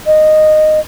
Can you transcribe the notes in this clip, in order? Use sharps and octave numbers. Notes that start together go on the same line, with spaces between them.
D#5